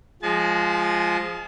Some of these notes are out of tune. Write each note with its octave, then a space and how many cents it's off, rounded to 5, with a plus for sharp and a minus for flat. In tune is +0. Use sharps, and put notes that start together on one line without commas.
F3 +0 G#3 +0 A5 -45